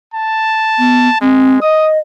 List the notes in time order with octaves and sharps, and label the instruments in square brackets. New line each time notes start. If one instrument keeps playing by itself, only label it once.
[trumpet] A5
[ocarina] B3
[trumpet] G#3 [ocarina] C4
[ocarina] D#5 [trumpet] D#6